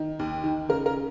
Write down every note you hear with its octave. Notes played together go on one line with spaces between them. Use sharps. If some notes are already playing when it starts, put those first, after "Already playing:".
Already playing: D#3
D#2
D#3
C#3 A#4
A#4